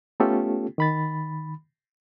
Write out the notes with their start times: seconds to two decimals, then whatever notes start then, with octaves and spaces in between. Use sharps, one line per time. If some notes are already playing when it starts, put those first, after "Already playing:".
0.20 A3 B3 C#4 F4 G4 A4
0.78 D#3 B5 A6